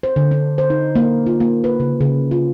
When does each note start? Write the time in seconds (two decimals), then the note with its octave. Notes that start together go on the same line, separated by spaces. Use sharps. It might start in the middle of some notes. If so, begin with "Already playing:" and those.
0.03 C5
0.16 D3
0.31 D4
0.58 C5
0.70 D#4
0.95 A#3
1.26 F4
1.40 A#3
1.64 B4
1.80 C#3
2.01 C#3
2.31 F4